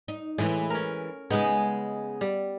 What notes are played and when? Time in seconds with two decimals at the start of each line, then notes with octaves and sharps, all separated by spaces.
0.08 D#4
0.38 A2 E3 G#3
0.70 C#4 A#4
1.30 C#3 G#3 B3 D#4
2.21 G3